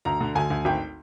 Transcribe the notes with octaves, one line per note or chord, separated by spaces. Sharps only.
D2 A#5
D3
D2 G#5
D2
G#1 G5